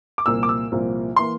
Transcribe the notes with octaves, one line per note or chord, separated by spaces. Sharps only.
D6
C2 A#2 F3 A#3 E6
D6
E6
C2 A#2 F3 A#3
E3 A#3 C6